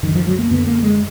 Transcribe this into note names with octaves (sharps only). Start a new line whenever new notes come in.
F#2 D3 D#3
F3
F#3
A#3
F#2 D3 B3
A#3
G#3